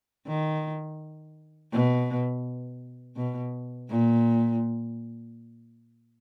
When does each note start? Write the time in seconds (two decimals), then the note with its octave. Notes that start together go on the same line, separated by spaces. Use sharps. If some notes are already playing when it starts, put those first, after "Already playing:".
0.27 D#3
1.72 B2
3.16 B2
3.89 A#2